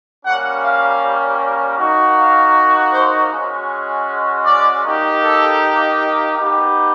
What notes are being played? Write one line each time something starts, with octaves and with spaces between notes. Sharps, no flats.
G3 A#3 C#4 F#5
F5
A#3 D#4 F#4
F5
C5
G#3 C#4 F#4
D5
A#3 D#4 G4
A4
B3 D#4 G4